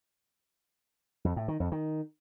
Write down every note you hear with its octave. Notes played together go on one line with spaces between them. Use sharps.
F2
A2
D#3
F2
D#3